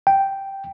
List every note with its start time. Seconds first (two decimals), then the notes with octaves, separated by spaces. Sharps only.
0.07 G5